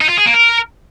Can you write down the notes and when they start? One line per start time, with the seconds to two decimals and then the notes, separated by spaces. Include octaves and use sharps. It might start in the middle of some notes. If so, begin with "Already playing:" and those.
0.01 D#4
0.09 F4
0.18 G#4
0.26 A#3
0.34 A#4